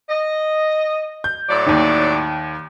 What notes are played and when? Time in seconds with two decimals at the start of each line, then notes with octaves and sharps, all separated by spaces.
0.10 D#5
1.24 G6
1.49 A2 F#3 D5
1.66 D#2 D#3